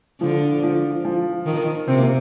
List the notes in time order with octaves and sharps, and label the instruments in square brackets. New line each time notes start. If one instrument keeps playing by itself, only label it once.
[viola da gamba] D3 [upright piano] F3
[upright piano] F3
F3
[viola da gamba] D#3
[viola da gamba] C3 [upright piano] C4
[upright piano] A#3